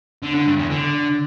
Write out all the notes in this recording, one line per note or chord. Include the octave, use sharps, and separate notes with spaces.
D3
D3
G2
E2
D3